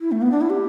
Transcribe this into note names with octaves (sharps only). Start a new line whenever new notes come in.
E4
A3
B3
D4
E4
G4